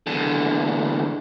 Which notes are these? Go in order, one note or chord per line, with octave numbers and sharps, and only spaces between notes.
E2 D3